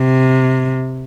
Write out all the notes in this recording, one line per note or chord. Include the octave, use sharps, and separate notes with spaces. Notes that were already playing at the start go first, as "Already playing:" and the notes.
Already playing: C3